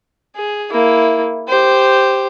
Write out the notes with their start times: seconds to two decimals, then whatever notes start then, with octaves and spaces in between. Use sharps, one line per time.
0.36 G#4
0.71 A#3 E4
1.48 G4 C5